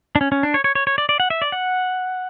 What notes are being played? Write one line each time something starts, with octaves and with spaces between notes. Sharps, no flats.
D4
C#4
C#4
D4
C#5
C#5
C#5
C#5
D5
D5
F#5
E5
D5
F#5